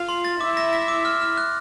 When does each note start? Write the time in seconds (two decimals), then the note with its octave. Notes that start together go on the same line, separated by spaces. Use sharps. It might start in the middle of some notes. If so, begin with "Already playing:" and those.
Already playing: F4 F5
0.09 C6
0.25 A6
0.41 E4 E5 D6
0.57 A#6
0.73 A#6
0.88 D6
1.05 F6
1.22 F6
1.37 F#6